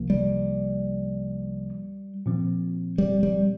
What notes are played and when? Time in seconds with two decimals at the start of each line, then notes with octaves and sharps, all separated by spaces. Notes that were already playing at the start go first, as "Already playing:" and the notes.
Already playing: C2 C3 F3 A#3
0.10 G3
2.26 A#2 F3 C4
2.98 G3
3.23 G3